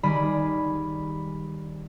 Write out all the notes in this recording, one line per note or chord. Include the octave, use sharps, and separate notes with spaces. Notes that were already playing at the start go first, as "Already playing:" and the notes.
D#3 G3 G#4 D5 B5 D#7